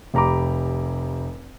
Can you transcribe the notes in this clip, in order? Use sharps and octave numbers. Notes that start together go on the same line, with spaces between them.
F1 G4 A#5 B5 D6